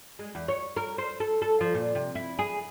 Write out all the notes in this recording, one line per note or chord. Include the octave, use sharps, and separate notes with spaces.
G#3
E2
C#5
A#4
C5
A4
A4
F3
A#2
C3
E4
G#4